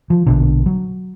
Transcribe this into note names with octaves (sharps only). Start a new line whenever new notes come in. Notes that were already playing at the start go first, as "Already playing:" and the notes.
F3
A#1 B2 D3
F#3